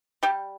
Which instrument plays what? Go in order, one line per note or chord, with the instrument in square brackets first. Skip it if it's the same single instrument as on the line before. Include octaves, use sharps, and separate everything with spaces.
[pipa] G3 G4